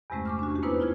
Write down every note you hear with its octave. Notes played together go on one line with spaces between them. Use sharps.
E2 G2 C3 G#3 A3 C#4
C#6 D6 F6
D4 F#4
F2 G4
A#3 B3 D#4 E4 B4 C5
E4 F4 F6 G#6